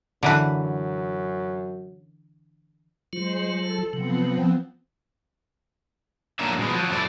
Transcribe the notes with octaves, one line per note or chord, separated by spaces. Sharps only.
F#2 D3 E3 B4
F#3 G#3 F4 C5
A4
C3 F3 F#3 B3 C4
F#3 A#3 C#4 D4 E5
B2 G#3 B3
F3 F#3
F#2 A3 E4 D5